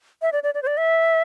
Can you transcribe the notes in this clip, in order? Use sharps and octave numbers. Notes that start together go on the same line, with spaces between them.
E5
D5
D5
D5
C5
D5
E5